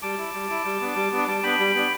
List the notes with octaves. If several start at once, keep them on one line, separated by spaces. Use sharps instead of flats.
G3 A5 D6
E4
G3
E4
G3
B3 D4
G3
B3 D4
G3 A5 D6
B3 D4 G5 B5
G3
B3 D4